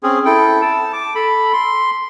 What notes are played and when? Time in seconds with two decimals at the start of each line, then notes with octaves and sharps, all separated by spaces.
0.03 C4 C#4 G#4
0.25 E4 A4 G5
0.62 A5
0.93 D6
1.15 A4 B5
1.53 C6